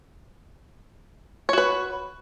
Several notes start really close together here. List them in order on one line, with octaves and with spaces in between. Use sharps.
C#5 F#4 B4